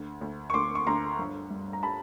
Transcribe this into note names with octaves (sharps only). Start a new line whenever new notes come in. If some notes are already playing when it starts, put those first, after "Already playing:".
Already playing: D2
D2
C#6
D2 C6 D6
C#6
D2 A#5 C6
G1
G2
A#5
G3 A5 B5